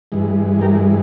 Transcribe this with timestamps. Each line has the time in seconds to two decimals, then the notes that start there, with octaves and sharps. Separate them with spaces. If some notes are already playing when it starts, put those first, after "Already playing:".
0.12 G2 E3 G#3
0.61 G4 A#4